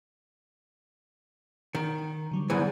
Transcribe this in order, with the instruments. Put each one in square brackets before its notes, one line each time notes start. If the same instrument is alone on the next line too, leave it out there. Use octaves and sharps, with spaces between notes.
[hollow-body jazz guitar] D#3
[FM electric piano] D3 F#3 G3
[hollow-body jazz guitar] E2 G#2 E3